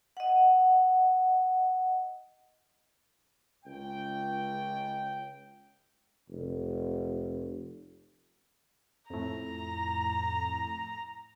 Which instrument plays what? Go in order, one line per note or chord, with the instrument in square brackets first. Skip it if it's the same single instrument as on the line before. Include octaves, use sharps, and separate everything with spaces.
[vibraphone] D#5 F#5
[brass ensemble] C#2 G5
[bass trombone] F1
[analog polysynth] F2 A2 [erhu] A#5